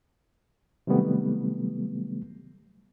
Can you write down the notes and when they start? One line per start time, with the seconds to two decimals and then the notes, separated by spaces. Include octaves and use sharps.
0.87 C3 D#3 F#3 G3 A3 B3